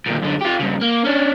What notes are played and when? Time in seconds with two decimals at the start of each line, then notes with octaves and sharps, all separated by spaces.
0.07 D2 A#2
0.22 F#2 D3
0.41 F4 G4
0.60 G2 C#3
0.81 A#3
1.05 C#4 D4